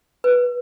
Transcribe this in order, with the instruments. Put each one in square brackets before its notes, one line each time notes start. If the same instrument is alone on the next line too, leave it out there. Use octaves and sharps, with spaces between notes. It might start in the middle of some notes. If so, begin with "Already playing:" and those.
[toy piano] B4